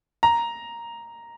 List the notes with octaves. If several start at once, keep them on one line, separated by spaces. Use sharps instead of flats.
A#5